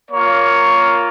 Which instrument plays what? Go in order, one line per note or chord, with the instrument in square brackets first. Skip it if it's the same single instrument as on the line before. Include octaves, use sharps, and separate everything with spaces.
[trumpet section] A#3 F4 C#5